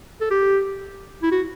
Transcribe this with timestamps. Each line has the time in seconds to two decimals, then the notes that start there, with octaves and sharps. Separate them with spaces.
0.21 A4
0.31 G4
1.23 E4
1.32 F#4